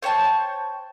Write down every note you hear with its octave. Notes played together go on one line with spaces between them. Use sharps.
C5 C#5 G5 A5